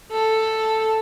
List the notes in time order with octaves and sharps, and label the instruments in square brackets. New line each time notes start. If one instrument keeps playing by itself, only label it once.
[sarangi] A4